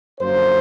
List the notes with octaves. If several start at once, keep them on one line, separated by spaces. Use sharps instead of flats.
F#2 D3 F3 A#3 C5